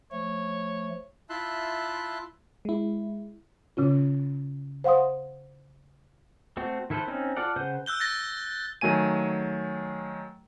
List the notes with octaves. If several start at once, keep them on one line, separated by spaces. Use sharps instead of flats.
F3 A3 C#5
E4 F4 E5 A5 C6 F#6
G#3 E4
A#2 C#3 C#4 F4
C5 F5 F#5 C6 D#6
A3 C4 F#4
D#3 E4 A4 B4 C5
C4 C#4 D#4
F4 A4 D5 F#5
C#3 B4 C5 F#5 G6
E6 F#6 G6 G7
A6 A#6
D#3 F#3 A3 G#5 D#7